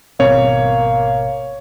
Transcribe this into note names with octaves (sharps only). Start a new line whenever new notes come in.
G#1 B2 A#3 C4 C#5